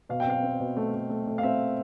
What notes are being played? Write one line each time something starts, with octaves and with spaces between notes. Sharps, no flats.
B2 F5
G5
C4 F5
C4
B2
A3
A3
A3
A3
F5
C4 E5